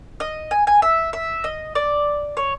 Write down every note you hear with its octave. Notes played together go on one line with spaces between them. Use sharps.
D#5
G#5
G#5
E5
E5
D#5
D5
C#5